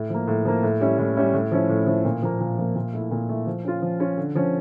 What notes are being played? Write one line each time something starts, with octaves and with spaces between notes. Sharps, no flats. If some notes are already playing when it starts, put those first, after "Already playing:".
Already playing: A2
F3 A#3
A2
F3 A#3
A2
G3 C#4 E4
A2
G3 C#4 E4
A2
F3 C#4 E4
A2
F3 C#4 E4
A#2
F3 A#3
A#2
F3 A#3
A#2
A3 E4
A#2
A3 E4
F3
C#4 F4
F3
C#4 F4
D3
F3 C#4